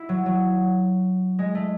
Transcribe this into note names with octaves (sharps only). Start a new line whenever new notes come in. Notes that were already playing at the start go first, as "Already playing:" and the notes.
Already playing: E4
F#3
F#3
G#3
A3